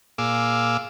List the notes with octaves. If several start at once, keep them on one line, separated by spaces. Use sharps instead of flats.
A#2 G#4 F5 D6 E6